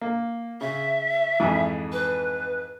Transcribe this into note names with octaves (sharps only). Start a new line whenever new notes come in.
A#3
C#3 E5
F2 G#2 E3
B4